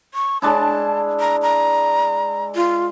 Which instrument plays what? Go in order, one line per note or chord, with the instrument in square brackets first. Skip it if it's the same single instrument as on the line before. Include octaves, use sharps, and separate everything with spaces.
[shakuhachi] C#6
[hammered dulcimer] G#3 D4 E4 [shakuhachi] A5
[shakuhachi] A#5
A#5
F4